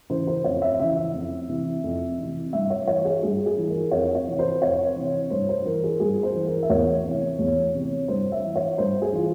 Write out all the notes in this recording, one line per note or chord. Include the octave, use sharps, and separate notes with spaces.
C#3 E3 C5
C5
F2 C#5
E5
C#3 E3 E5
E5
F2
C3 E3
F2
C3 E3
G2 E5
C#5
E3 C#5
G#4
G2 G#4
G#4
E3
A#4
F2 C#5
C#5
C3 E3
C5
F2 C#5
C3 E3
G2 C5
C5
E3 A#4
G#4
G2 G#4
C5
E3
A#4
E5
E2 C#5
C3 E3
E2
C3 E3
G2 C5
E5
E3
C#5
G2 C5
G#4
E3 F4